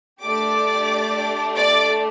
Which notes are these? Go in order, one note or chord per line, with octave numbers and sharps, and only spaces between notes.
A3 D4 G4 D5 D6
D5 D6